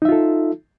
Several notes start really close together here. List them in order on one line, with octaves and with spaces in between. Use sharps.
D#4 E5 F4 A4